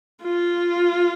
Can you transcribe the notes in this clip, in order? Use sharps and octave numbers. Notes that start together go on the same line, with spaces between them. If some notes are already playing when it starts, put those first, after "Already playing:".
F4